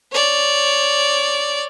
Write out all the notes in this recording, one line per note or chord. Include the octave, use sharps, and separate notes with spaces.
C#5 D5